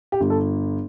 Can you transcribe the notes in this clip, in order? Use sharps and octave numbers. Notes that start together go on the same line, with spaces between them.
G4
G1
A4